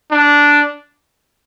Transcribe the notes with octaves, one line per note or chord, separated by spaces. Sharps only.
D4